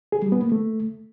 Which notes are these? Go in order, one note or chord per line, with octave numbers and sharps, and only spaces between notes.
G#4
G3
B3
A#3
A3